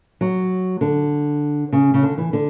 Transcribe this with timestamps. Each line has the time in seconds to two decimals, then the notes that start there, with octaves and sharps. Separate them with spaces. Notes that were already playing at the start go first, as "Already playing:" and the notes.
0.21 F#3
0.81 D3
1.73 C#3
1.94 C#3
2.03 D3
2.18 E3
2.33 D3